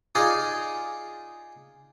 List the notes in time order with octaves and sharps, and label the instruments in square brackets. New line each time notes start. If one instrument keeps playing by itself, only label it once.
[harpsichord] D#4 F4 G#4 D5 D#5 F5